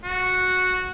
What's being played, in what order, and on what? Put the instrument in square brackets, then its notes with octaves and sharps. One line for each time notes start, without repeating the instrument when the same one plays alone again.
[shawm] F#4